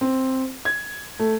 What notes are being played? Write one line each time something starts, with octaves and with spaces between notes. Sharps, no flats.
C4
G#6
A3